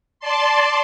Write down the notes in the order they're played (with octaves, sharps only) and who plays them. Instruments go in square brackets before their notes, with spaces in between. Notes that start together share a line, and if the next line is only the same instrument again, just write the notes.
[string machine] D5 A5 C6